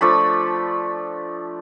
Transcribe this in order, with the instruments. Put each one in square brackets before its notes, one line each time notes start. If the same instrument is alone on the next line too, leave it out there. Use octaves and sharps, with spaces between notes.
[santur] F3 A3 D4 B5